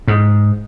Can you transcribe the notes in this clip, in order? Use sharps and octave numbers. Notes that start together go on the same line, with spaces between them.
G#2